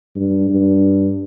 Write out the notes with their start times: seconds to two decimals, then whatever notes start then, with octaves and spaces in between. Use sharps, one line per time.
0.16 G2
0.50 G2